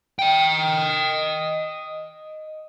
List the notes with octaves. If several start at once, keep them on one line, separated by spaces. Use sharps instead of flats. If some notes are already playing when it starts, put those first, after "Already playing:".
D#5 G5